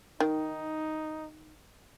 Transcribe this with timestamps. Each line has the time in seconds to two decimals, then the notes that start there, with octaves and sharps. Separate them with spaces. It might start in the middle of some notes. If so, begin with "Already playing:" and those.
0.20 D#3 D#4